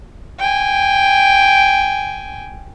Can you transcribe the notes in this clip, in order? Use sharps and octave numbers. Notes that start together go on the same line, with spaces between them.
G5 G#5